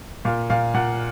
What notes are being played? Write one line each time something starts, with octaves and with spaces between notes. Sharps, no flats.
A#2 F5
A#2 F5
A#2 F#5